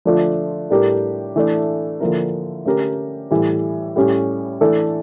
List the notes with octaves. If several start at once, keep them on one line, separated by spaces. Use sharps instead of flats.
D3 F3 A3 D4 F4
A2 G3 D4 G4 A#4
E3 A3 D4
D3 F3 A#3 E4 A#4
D3 A3 C#4 G4 A#4
A2 E3 G3
A2 G3 C#4 G4
E3 A3 D4 A4